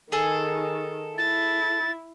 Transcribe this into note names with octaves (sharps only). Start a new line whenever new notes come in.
D#3 G#4 A4
E4 A6